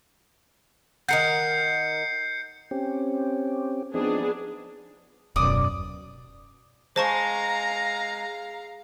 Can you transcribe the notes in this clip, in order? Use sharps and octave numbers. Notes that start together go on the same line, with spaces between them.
D#3 A#4 F#5 G6 C7 C#7
C4 C#4 G4
F3 B3 C4 D4 D#4 G#4
D#1 F#2 B2 D5 D#6
G#3 C5 F5 A5 A#5 C#6 A#6